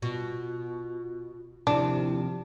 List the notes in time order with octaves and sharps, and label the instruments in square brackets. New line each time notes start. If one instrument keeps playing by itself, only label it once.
[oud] B2 [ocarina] F4
[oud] D#2 C3 F3 [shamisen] D4 [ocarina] E4